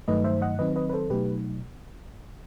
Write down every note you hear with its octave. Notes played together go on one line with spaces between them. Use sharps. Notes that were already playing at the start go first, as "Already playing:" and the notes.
G2 D#3 F#3 A3 D#4 B4 D#5
C5 E5
D#5 F#5
D#3 F#3 C4 D#4 B4 D#5
B4 D#5
B4
A4 C5
B2 F#3 A3 D#4 G4 B4